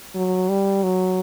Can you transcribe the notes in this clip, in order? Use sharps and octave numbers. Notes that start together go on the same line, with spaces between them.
F#3
G3
F#3